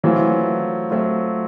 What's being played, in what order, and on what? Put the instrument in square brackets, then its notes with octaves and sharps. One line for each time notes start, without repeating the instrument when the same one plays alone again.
[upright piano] E3 [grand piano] F#3 A3 C4 F4
[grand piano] F#3 A3 C4 F4